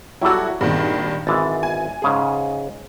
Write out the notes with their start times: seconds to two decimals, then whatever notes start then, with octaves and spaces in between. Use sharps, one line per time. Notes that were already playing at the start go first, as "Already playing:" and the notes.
0.22 F#3 G3 E4 F#4 A4
0.61 G#1 G2 A#2 D#3
1.27 G#1 E3 G#3 A6
1.63 G#5
2.02 G#2 C#3 G#4